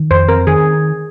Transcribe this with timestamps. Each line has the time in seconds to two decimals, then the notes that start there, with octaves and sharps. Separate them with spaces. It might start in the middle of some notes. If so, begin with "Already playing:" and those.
Already playing: D#3
0.10 F2 C5
0.29 C4 A#4
0.47 D#3 G#4